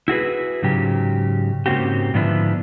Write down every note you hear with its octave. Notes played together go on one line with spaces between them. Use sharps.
E4 F#4 G#4 B4
G#2 C#3 F#3 G4
G#2 C#3 A#3 C4 F#4 G4
G#2 D3 F3 B3 D4 E4